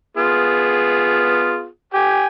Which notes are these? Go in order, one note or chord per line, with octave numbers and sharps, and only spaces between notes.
B3 F4 G#4
G4 G5 G#5